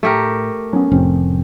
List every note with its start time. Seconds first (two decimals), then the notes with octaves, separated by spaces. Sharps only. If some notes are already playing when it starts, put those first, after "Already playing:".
0.03 A2 A3 G4 A#4
0.73 F#3 B3 C#4
0.92 F1 A2 F3 C4 C#4